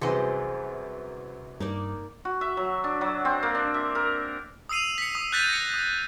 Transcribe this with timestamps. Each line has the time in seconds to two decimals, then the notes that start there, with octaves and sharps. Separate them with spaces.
0.01 C2 F#2 E3 G#4 C5 D#5
1.60 G2 A#3 D#4 D5
2.25 F#4
2.41 E5
2.57 F#3
2.84 D4
3.01 F#3
3.25 C4
3.43 A#3
3.55 D4
3.74 E5
3.95 A#4
4.69 D#6 E6 C7 D#7 F7
4.98 B6 C#7
5.15 D#6
5.32 F#6 G6 A6 B6 D#7
5.48 A#6 C#7
5.74 D#6